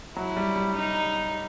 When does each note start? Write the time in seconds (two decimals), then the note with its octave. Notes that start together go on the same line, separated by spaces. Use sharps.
0.16 F#3 E4
0.37 G3
0.56 G3
0.75 D#4